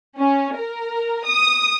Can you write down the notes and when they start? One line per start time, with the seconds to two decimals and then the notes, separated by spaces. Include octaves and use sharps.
0.18 C#4
0.57 A#4
1.29 D#6